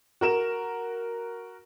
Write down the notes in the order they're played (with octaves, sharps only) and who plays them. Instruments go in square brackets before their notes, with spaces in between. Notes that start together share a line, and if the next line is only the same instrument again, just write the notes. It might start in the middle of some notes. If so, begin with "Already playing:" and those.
[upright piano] F#4 A#4 E7